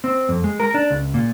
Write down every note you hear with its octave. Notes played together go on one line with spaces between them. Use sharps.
C4
F2
G#3
A#4
D4
C#2
A#2